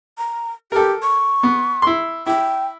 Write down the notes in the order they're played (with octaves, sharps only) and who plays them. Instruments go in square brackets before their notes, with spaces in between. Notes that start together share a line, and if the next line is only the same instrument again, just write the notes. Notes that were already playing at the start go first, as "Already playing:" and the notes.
[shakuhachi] A#5
[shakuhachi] G4 [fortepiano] A4 A#4
[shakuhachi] C#6
[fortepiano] B3
E4 C6
[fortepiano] E4 [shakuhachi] G5